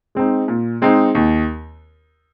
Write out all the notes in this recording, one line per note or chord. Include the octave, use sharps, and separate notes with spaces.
G#3 C4 D#4
A#2
G#3 C4 D#4
D#2